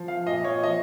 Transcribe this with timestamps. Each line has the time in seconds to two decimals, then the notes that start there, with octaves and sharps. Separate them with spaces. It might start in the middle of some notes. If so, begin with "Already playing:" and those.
Already playing: F3
0.08 F5
0.27 A#2 D#5
0.44 C#5
0.63 F3 D#5